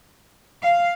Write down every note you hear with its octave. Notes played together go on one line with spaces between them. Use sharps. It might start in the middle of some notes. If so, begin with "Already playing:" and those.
F5